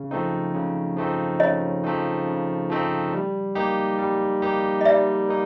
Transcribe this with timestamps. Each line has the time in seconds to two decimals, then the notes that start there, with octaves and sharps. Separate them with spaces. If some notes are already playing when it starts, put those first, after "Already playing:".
Already playing: C#3
0.11 F3 A3 C4 D#4
0.54 C#3
0.97 F3 A3 C4 D#4
1.40 C#3 C#5 D#5
1.84 F3 A3 C4 D#4
2.27 C#3
2.70 F3 A3 C4 D#4
3.13 G3
3.55 A#3 D#4 G4
3.99 G3
4.42 A#3 D#4 G4
4.81 D#5
4.85 G3 D5 E5
5.29 A#3 D#4